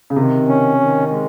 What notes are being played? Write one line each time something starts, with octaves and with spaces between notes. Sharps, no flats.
C#3
C3 D#3
C#4
D#3
G#3